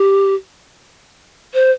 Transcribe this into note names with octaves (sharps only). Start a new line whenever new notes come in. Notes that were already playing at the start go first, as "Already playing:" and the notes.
Already playing: G4
C5